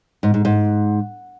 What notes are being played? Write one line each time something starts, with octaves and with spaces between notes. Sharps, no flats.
G#2
G#2
G#2